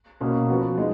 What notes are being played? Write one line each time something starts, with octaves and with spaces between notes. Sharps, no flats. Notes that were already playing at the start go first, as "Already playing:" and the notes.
B2 A#3 C#4
F3 B3 F#4
G#3 D#4